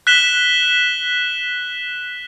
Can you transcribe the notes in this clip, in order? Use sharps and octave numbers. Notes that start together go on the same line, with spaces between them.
F#6 B6 E7 G7